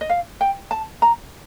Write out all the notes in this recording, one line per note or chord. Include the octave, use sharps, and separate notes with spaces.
D#5
F5
G5
A5
A#5